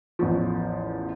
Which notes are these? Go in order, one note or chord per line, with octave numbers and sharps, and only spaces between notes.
A1 E2 F3